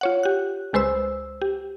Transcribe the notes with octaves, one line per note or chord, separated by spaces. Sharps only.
F4 C#5 F#5
G4 F#6
C#2 G#3 B4 C5 E6
G4